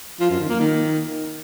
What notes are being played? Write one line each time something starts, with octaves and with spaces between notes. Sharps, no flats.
F3
F#2
D#3
A#3
D#3